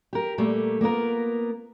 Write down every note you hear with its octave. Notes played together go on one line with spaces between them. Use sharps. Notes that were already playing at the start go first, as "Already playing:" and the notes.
G4 A#4
A#2 G3 A3 A#3
A#3 B3 F4 A#4